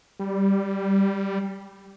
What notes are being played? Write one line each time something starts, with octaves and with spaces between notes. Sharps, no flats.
G3